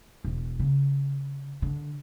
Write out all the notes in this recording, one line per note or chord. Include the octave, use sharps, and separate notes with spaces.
E1
C#3
D3